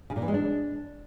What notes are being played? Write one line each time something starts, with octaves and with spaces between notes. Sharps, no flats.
C#3
A#2
E3
G#3
D4